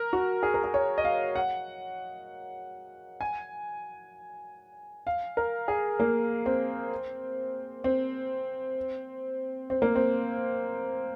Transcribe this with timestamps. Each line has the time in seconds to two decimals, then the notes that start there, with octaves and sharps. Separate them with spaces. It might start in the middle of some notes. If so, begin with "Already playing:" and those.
Already playing: A#4
0.13 F#4
0.43 G#4
0.54 A#4
0.64 G#4
0.74 C#5
0.98 D#5
1.05 F5
1.36 F#5
3.21 G#5
5.07 F5
5.37 A#4
5.68 G#4
6.00 A#3
6.46 C4
7.84 C4
9.70 C4
9.82 A#3
9.95 C4